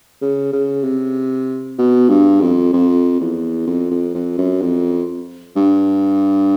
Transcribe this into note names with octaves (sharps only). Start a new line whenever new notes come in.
C#3
C#3
C3
B2
G2
F2
F2
E2
F2
F2
F2
F#2
F2
G2